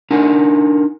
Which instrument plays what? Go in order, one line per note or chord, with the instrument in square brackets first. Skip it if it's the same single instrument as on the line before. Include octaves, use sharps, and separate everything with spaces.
[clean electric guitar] D4 D#4 A#4 F#5 G#5